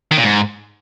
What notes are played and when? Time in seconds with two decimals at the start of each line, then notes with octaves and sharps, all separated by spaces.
0.11 D#3
0.17 A#2
0.24 G#2